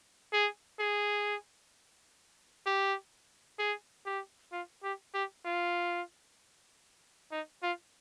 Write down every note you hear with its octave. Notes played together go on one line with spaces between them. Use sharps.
G#4
G#4
G4
G#4
G4
F4
G4
G4
F4
D#4
F4